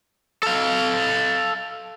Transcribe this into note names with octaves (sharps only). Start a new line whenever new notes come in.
A4 F5